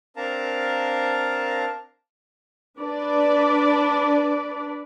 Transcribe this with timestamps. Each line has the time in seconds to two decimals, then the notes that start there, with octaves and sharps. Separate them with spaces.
0.17 C4 D4 A#4 F5 A5 A#5
2.79 D4 B4 D5